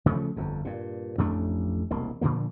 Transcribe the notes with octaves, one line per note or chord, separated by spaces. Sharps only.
C#3 F3 G#3 A3
G1 F2
G2 A#2
A1 F2 A3 D4
E1 C2 A#3
A#2 D3 F3 A#3